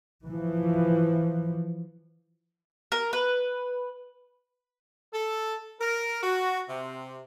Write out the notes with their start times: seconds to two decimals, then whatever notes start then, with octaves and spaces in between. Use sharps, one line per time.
0.25 E3 F3
2.92 A#4
3.13 B4
5.13 A4
5.80 A#4
6.23 F#4
6.69 C3